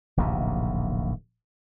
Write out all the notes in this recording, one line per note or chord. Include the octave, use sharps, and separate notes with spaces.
D1 A#1 D#2 C3